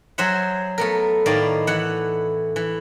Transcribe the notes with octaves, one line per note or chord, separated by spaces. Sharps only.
F#3 G#4 C5 E5 F#5
A3 B3 A#4
A2 D#3 D#4 D5 F5
E3 F#5
E3